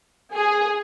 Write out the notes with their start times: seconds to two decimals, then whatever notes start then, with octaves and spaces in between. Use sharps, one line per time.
0.34 G#4